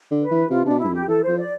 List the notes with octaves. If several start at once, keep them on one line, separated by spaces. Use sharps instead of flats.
D3
B4
E3
C3 F4
B2 C3 D4
E4
G2
F2
G4
E3 A4
F3 C5
D5